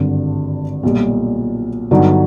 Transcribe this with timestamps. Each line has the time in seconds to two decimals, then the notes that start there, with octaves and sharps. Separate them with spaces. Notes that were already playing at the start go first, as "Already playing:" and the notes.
Already playing: G#1 G2 D3
0.83 B1 A#2 G3
1.91 G2 D3 F#3 B3 D#4